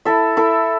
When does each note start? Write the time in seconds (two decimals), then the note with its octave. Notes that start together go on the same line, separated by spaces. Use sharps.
0.05 E4 A4 E5
0.37 E4 A4 E5